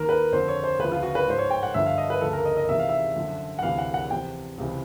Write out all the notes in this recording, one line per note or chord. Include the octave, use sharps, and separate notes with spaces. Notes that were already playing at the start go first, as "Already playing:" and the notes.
Already playing: D#2 D#3 A#4
B4
F2 D3 F3 C5
C#5
C5
D2 C#3 F3 B4
F4
F#4
B4
G#2 F3 C5
C#5
G5
F#5
G2 D3 F3 E5
F5
D#5
B4
D2 C#3 F3 A4
A#4
D#5
D#5
E2 C3 D#3 E5
F5
E5
F#2 D3 F3
F#5
D2 C3 E3 F5
F#5
F#5
E2 C3 F3 G5
C#2 C3 E3